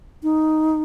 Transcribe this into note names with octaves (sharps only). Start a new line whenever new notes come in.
D#4